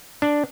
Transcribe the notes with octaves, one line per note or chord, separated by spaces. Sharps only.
D4